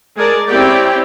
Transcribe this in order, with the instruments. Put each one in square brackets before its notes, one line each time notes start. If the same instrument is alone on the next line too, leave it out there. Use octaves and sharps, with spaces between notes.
[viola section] G#3 G#4 A#4 D5 A5
C4 C#4 E4 G4 D5 G5